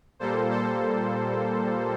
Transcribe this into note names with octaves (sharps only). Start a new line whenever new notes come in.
A#2 G3 A#3 A4 C5
A4 C5